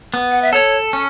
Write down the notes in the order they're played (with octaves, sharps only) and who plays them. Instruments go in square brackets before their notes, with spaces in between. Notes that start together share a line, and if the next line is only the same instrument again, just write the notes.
[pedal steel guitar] B3
[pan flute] F#5
E5
[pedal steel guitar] A4 [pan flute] C#5
[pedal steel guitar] C#4